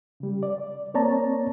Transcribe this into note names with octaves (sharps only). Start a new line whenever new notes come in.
C#3 G3
D5
A#3 C4 C#5 D5 A5 A#5